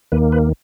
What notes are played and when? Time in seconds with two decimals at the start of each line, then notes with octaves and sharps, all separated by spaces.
0.12 D#2 D#3 A#3 B4
0.32 B4